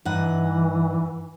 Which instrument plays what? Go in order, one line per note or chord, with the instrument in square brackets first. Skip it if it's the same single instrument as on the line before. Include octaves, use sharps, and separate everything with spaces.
[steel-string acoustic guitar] G2 D#4 F#5 [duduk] E3